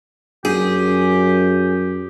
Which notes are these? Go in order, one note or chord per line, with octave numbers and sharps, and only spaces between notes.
F#2 G4 G#4